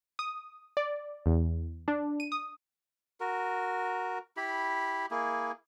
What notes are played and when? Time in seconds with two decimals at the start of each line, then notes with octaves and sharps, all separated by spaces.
0.19 D#6
0.77 D5
1.26 E2
1.88 D4
2.20 D#7
2.32 D#6
3.20 F#4 A#4
4.37 E4 G4 B5
5.11 A#3 E4 G#4